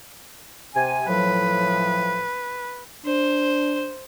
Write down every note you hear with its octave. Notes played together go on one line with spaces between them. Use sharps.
C3 G#5
A2 F3 F#3 B4
D4 C5